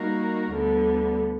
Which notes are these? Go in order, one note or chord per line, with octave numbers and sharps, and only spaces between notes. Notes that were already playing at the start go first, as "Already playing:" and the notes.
Already playing: G3 A#3 D#4 F#4 A#4
D2 D3 G3 B3